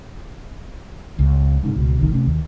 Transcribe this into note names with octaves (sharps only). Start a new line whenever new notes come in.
C#2
G#2 C#3
C#2 B2
G1 C2 A2 D#3
C3 A3 C#4
D#2